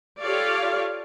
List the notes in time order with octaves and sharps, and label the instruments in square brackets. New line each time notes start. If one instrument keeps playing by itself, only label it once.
[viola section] F4 G4 A4 C#5 D5 F5